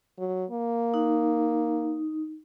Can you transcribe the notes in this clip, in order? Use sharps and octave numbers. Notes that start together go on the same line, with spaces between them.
F#3
A#3
D#4